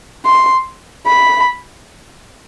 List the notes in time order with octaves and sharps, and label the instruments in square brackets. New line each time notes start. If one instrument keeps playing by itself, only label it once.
[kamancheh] C6
B5